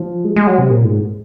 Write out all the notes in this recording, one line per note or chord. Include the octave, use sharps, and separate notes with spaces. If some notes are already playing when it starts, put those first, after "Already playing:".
Already playing: F3
G#3
G#3
F#3
C3
A#2
G#2